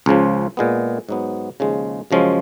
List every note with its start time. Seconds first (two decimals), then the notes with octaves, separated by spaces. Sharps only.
0.06 C#2 C#3 F3
0.57 A#2 G#3 B3
1.09 G#2 F#3 B3
1.60 D#2 C#3 F3 G#3
2.11 F#2 C#3 F3 G#3 C#4